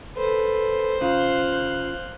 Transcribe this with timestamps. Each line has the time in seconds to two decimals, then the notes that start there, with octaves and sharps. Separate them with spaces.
0.17 A4 B4 C5
1.01 C#3 F4 F5 F#6 G6